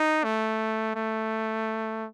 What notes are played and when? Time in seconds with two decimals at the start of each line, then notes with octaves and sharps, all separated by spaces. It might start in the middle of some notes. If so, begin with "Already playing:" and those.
Already playing: D#4
0.24 A3
0.95 A3